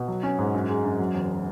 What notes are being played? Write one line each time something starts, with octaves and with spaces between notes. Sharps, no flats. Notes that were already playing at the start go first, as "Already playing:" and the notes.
Already playing: B2
F#3
C#4
G#2
F#2
G#3
F#2
F#3
E1